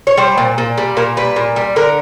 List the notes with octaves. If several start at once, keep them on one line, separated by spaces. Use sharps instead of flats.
C#5
G3 C5
A#2
A#2
G3
A#2 A#4
G3 B4
A#2
G3
D3 A#4